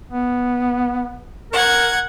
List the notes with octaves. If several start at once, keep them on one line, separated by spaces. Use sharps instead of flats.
B3
A#4 F#5 G#6